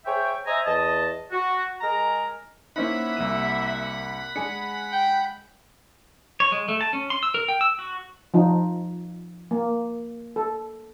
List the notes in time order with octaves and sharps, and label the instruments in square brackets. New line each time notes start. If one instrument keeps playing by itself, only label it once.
[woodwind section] G#4 C5 C#5 E5 G5
C5 D#5 E5 G#5 A#5
E2 D#5 A5
F#4
G#3 G#4 A#4 A#5
[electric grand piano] A#3 C#4 E4 [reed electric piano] D#4 C5 [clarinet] E5 [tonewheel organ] F#5 B5
[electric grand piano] C2 A#3 D#7 [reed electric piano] E6
[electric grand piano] G#3 G#5 C#7 [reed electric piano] D4 G#4
[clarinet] G5
[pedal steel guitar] C#5
G#3
A3
A5
C#4
C6
E6
A#4
G5
E6
F#4
[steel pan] F3 D#4 F4
A#3
A4